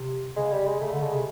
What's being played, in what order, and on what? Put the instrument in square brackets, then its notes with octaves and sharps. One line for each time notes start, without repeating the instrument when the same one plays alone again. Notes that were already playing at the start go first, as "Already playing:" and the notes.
Already playing: [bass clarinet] C3
[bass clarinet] C#3 [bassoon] G#3
[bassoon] G3
G#3
[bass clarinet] C#3 [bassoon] A3
[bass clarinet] D3
[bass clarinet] C#3 [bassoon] G#3
[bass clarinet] C3